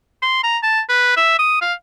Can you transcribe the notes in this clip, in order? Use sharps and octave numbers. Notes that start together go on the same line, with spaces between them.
C6
A#5
A5
B4
E5
D#6
F5